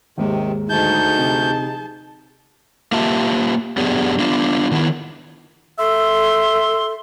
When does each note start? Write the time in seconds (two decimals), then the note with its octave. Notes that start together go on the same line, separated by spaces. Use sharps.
0.18 D#2 G#2 C3 D#3
0.69 D2 D#4 G#4 A5 G6
1.17 C3
2.92 A#3 F4 G4 E5 A5
3.77 F#2 B3 D4 G4 G#4
4.19 B3 D4 F4
4.71 D#3 B3 D#4 E4
5.79 A4 E5 C6